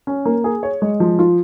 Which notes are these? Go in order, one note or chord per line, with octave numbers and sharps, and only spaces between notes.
C#4
A#3
G#4
C#5
G#3
F3
F4